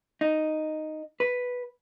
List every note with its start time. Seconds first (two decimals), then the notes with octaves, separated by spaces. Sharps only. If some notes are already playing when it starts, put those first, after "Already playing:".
0.21 D#4
1.20 B4